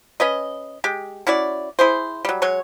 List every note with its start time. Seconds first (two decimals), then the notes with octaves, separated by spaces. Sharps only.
0.20 C#4 B4 D#5
0.84 G#3 G4
1.27 C#4 E4 F#4 D5
1.79 E4 G#4 C5
2.25 F#3 G3
2.42 F#3 G#3 C#5